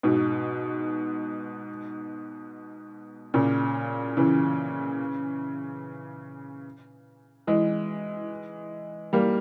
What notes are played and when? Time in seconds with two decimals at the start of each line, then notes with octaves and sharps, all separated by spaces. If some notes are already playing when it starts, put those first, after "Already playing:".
0.03 G#2 B2
3.34 A#2 C#3
4.17 C#3 E3
7.47 E3 G#3
9.13 G3 A#3